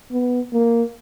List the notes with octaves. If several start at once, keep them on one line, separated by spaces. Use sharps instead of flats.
B3
A#3